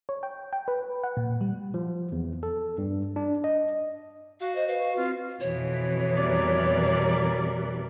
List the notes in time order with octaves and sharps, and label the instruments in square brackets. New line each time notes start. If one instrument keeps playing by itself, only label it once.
[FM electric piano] C#5
G5
G5
B4
F#5
A#2
G3
[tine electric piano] F3
E2
A4
G2
D4
D#5
[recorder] F#4 [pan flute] F5
[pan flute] C5 [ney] D#5
[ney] B4 [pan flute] F5
[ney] C4 [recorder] F4
[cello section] F2 B2 E3 [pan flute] C#5
[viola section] G3 A#4 D5